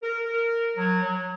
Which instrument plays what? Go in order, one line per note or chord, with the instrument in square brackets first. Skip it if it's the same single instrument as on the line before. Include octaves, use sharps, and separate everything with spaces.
[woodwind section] A#4
A#4
F#3
F#3